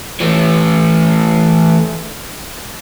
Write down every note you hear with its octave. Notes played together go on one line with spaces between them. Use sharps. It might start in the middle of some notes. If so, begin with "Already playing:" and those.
E3 A3